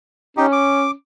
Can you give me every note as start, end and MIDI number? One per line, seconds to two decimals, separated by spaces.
0.37 0.92 61
0.37 0.46 63
0.37 0.46 67
0.52 0.91 86